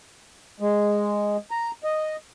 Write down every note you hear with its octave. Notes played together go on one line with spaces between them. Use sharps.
G#3
A#5
D#5